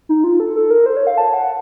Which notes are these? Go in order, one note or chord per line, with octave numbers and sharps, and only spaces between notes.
D#4
F4
A4
A4
A#4
C5
C#5
F5
A5
F#5